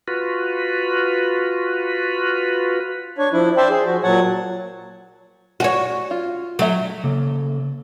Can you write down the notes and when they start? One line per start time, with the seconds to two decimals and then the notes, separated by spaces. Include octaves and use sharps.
0.08 F4 F#4 B4
3.18 D4 C#5
3.33 F3 D4 E4
3.57 C5 D5 E5 G5 A5
3.70 G#4
3.86 F3 F#4
4.03 A#2 F#3 C#5 F#5 A5
5.60 F#4 C#5 F#5 G#5
6.11 F4
6.59 F#3 A3 E5
7.04 C#3 A#3 A4